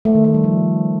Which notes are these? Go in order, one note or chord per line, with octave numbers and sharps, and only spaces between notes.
A3
D#3
A3
G3
F3